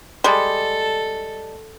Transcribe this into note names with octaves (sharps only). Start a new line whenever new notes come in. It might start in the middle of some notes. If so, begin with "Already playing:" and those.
G3 G#3 A4